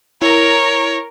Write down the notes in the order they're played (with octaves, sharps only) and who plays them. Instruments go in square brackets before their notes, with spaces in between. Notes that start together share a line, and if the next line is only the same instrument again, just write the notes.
[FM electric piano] E4 [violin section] A#4 [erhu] C#5